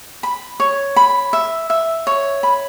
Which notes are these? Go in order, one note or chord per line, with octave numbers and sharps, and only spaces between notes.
B5
C#5
B5
E5
E5
C#5
B5